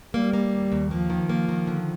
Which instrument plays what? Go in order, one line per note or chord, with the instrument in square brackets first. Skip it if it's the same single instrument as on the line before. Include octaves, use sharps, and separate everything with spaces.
[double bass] G3 [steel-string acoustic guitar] A#3
[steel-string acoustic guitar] A#3
D#2
D#2
[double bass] F3 [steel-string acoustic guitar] A#3
[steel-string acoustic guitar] D#3
A#3
D#3
D3